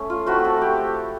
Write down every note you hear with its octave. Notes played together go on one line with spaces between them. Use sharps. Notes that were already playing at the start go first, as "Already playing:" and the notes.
Already playing: A3 C#4
F4
A3 C4 E4 F#4
A4
G4